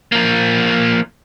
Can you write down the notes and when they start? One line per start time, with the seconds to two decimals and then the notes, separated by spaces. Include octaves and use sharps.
0.12 F3 A#3